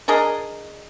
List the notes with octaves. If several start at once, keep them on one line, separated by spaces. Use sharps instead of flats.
D4 G#4 A#4 D#5